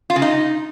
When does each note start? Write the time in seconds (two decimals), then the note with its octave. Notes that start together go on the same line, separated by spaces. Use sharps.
0.10 F4
0.16 C#3
0.22 D#4